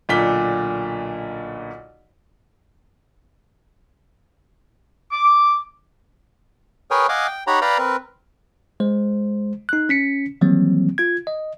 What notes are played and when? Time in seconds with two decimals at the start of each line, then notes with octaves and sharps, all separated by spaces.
0.09 B1 A#2 D3 B6 G7
5.12 D6
6.91 G#4 A#4 B4 C#5 G5 G#5
7.09 D#5 F5 F#5 G#5 D6
7.27 G5
7.47 D#4 G4 C#5 F#5 A#5 B5
7.61 B4 D5 F5 G5 A#5 B5
7.78 C4 A#4 B4
8.80 G#3 C5
9.69 D#4 F#6
9.89 C#4 B6 C#7
10.41 D#3 E3 F#3 G3 A#3 C4
10.98 F4 G#6
11.27 D#5